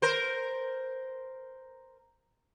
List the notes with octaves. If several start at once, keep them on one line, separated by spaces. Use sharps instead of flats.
A#4 C5